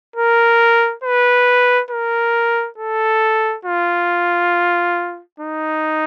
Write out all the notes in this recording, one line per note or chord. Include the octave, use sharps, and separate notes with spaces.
A#4
B4
A#4
A4
F4
D#4